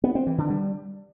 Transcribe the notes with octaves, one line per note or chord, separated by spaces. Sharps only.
B3
C4
E3
D3
G3